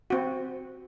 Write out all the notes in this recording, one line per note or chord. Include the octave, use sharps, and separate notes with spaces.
C4 F#4